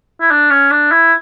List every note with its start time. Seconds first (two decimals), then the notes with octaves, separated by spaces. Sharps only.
0.21 E4
0.31 D4
0.51 C#4
0.71 D4
0.92 E4